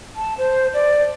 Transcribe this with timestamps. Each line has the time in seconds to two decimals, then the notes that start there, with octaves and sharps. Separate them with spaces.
0.16 A5
0.38 C5
0.74 D5